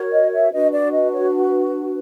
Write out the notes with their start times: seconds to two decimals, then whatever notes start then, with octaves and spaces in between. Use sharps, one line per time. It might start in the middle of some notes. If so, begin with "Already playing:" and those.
Already playing: F#4 A#4 C#5
0.12 D#5
0.33 E5
0.53 D4 F#4 B4 D#5
0.73 D5
0.93 D#5
1.13 C#5